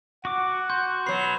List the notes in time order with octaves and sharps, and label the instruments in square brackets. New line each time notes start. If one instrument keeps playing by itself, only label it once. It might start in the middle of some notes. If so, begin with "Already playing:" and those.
[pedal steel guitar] F#4 D6 [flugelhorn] F#5
[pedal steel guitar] F#4 [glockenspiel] C6 G6
[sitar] B2 F#3 [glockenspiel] B5 C7